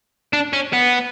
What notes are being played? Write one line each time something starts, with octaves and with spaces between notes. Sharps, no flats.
D4
C#4
B3